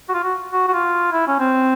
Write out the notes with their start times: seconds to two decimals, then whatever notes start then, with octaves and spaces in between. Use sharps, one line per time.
0.09 F#4
0.14 F4
0.24 F#4
0.53 F#4
0.68 F#4
0.74 F4
1.12 E4
1.28 C#4
1.39 C4